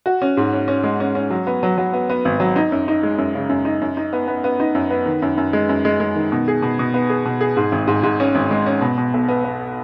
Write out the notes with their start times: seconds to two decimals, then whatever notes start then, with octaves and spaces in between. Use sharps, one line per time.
0.06 F#4
0.22 C#4
0.37 G#2
0.53 C#4
0.68 C#4
0.84 G#3
1.00 C#4
1.15 C#4
1.30 F#3
1.47 B3
1.63 F#3
1.78 F#3
1.93 B3
2.10 B3
2.25 G#1
2.40 F#3
2.56 D#4
2.72 F#2
2.88 D#4
3.03 G#3
3.18 F#2
3.35 C#3
3.49 F#2
3.65 D#4
3.81 F#2
3.97 D#4
4.13 B3
4.28 B3
4.44 B3
4.60 D#4
4.75 F#2
4.91 B3
5.06 D#3
5.22 F#2
5.37 F#2
5.53 G#3
5.69 F#2
5.85 G#3
6.00 G#3
6.16 D#3
6.32 B2
6.48 G#4
6.62 B2
6.79 B2
6.94 B3
7.10 G#4
7.25 B2
7.41 G#4
7.57 G#2
7.72 G#1
7.88 G#2
8.03 G#2
8.20 C#4
8.35 G#1
8.51 G#3
8.66 C#4
8.81 B2
8.98 B2
9.14 B1
9.28 B3
9.44 B3